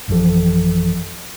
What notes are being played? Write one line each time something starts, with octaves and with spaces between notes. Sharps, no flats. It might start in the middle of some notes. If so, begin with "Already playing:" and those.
A1 F#2 E3 F3 A4